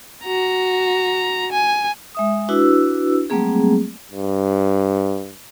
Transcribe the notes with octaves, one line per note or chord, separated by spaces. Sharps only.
F#4 A#5
G#5
G#3 E5 D#6
D4 E4 F#4 B4 E6
F#3 G3 A3 A#3 C4 G#4
G2